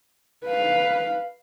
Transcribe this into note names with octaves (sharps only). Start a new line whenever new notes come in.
B4 F5